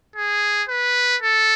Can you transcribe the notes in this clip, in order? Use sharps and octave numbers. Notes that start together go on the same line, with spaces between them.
G#4
B4
A4